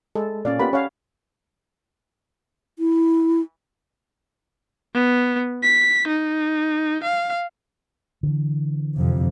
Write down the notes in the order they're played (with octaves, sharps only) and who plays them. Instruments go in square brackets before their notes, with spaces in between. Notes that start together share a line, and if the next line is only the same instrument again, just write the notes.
[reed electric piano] G#3 [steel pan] A4
[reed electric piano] A#2 F5 [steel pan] C#4 D5
[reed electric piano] A#3 B3 F4 [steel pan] G4 B5
[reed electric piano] C#4 F#5 [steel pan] C#5 F5
[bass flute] E4
[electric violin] B3
B6
D#4
F5
[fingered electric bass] D3 E3
[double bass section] F2 C3